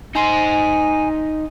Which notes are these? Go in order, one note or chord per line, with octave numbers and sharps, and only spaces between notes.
D#4 C5 G#5